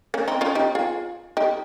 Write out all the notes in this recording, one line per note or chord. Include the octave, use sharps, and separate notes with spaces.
A#3 C#4
C4 D#4
C#4 F4
D#4 G4
F4 G#4
D#4 G4